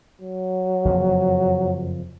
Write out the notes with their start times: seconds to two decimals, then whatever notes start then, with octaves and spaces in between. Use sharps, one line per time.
0.21 F#3
0.85 F#1 F2 F3